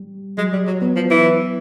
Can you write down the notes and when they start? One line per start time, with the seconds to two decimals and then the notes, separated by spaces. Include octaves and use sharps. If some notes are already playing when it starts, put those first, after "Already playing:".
Already playing: G3
0.38 F#3 G#3
0.53 G3
0.67 F#3
0.81 F#3 B3
0.96 F3
1.10 E3